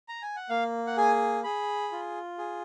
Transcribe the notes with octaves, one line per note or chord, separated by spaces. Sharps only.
A#5
G#5
F#5
A#3 F5
F#5
G#4 G#5
G#4 B5
F4
G#4